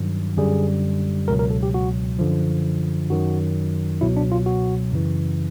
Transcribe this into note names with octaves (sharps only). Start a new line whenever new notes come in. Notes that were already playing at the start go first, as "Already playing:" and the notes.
Already playing: G2 D#3 F#3
F#2 D3 G3 G#4
C#2 B2 F#3 A#4
A#4
A4
G4
F#4
F#2 D3 F3
F#2 D#3 F#3 F#4
C#2 B2 F#3 E4
D4
F4
F#4
F#2 C#3 E3